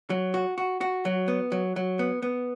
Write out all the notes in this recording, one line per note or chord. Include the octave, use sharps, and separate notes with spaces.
F#3
F#4
F#4
F#4
F#3
B3
F#3
F#3
B3
B3